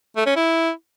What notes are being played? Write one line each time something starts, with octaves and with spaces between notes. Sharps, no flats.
A3
C#4
E4